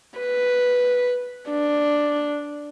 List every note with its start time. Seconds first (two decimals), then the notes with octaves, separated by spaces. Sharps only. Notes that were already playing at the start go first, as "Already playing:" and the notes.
0.19 B4
1.51 D4